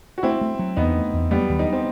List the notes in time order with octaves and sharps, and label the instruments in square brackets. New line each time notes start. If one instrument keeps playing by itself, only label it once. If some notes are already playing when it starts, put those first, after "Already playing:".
[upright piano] F#4
[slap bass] A3 [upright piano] C4 E4
[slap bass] A3
F#3
[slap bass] E2 [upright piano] B3 D#4
[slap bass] A3
E2
[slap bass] F#3 [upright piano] G3 B3
[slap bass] D#2
[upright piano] D#4
C4